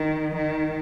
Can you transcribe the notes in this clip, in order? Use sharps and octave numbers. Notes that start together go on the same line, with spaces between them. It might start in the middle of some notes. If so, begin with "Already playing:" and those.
Already playing: D#3
D#3